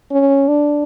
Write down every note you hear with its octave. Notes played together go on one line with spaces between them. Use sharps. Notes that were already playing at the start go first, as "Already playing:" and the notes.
C#4
D4